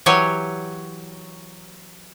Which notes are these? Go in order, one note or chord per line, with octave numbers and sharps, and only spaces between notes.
E3 F#3 G4 C#5 G#5